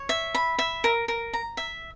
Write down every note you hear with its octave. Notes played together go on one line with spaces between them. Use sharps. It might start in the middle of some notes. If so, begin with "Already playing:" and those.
Already playing: C#5
E5
B5
E5
A#4
A#4
A#5
E5